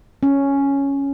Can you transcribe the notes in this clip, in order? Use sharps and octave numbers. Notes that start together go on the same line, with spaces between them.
C#4